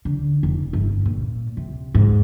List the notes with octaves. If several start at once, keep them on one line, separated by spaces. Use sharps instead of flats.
D3
F1
G1
A#2
C3
G#2